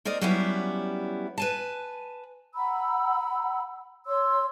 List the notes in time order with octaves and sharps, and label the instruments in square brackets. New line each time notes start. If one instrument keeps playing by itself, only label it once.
[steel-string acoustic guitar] C4 A#4 D5 D#5
F#3 G3 B3 C#4 E4 G4
B4 G#5 A5
[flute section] F#5 A#5 B5 E6
C#5 C6 E6